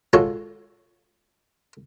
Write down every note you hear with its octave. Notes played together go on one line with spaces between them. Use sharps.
G#3 F4 F#4 A4 C#5 G#5